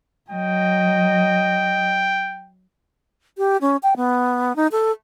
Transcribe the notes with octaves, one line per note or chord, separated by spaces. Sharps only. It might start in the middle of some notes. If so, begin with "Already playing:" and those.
F#3 D#5 G5
G4
C#4
G5
B3
D#4
A4